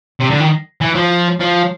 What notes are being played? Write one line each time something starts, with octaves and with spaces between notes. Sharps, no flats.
C3
D3
D#3
E3
F3
F3